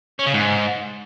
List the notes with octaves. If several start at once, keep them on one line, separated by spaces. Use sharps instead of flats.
C#4
C#3
G#2